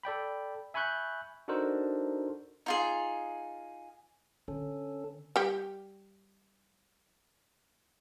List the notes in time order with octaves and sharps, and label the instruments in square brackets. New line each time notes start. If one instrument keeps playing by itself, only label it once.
[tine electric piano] A4 D5 G5 B5
E5 G#5 B5 C#6 F#6 G6
D4 D#4 F#4 A4 A#4 C5
[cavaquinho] D#4 F4 G#4
[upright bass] D3 [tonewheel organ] C#4 A4
[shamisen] G3 G4